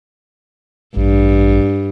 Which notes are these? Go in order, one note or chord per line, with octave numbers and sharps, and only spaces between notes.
A1 G2